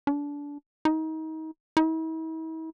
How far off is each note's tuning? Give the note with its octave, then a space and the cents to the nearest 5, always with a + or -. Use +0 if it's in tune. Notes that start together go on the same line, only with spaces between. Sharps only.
D4 -25
D#4 +30
E4 -45